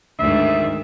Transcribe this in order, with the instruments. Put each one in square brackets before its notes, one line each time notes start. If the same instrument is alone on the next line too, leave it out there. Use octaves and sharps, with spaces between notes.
[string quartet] D2 G#2 D#3 [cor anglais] E5